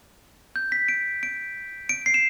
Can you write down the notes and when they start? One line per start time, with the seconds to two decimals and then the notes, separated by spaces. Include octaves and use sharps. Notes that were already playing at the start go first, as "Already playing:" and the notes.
0.56 G6
0.72 B6
0.88 D7
1.23 D7
1.89 D7
2.06 C7
2.14 E7